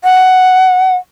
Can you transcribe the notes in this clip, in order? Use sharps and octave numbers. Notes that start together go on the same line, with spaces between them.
F#5